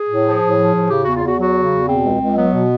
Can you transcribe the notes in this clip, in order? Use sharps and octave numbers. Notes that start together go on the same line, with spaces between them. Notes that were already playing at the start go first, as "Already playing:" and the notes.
Already playing: G#4
A2
F3
A2
F3
A2
C#3 G4
E2 F#4
F4
E2 F#4
F#3 F#4
C#3
E2
B2 C4
C#2
C#2
F#3 B3
B2